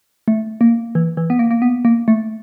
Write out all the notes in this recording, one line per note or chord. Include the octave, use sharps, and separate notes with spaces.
A3
A#3
E3
E3
B3
A#3
A#3
B3
A#3
A3